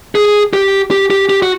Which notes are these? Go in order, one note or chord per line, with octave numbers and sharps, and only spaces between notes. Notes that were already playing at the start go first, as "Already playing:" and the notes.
G#4
G4
G4
G4
G4
F#4